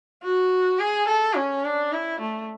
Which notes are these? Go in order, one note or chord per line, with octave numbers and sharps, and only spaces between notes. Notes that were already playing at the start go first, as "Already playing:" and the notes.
F#4
G#4
A4
C#4
D4
E4
A3